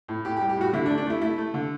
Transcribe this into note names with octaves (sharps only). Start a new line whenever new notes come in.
A2
A2 G4
G4
G3
G4
A2 F#4
D3 E4
D4
A3
D4
A3 E4
A3 E4
A3
D3